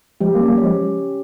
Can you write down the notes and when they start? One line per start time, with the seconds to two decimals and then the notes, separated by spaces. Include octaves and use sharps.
0.21 F3 G#3 G4
0.35 G3 A#3
0.39 C#4
0.49 G3 A#3
0.58 C#5
0.63 F3 G#3